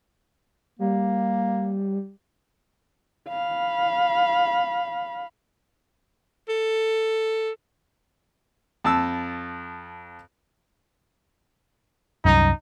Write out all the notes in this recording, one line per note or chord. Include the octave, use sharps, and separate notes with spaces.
G3 A#3
F5 B5
A4
F2 A5 E6
C2 F#2 D#4